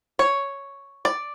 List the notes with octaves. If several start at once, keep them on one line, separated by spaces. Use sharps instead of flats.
C#5
D5